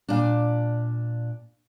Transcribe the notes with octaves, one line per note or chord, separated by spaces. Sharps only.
A#2 D4